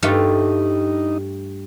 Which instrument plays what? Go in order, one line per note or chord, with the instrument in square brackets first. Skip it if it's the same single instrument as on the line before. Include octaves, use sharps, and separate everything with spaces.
[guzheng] G2 A3 F4 [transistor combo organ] D#4